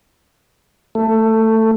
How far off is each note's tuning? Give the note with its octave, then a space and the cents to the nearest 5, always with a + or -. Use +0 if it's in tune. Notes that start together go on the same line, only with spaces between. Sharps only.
A3 +15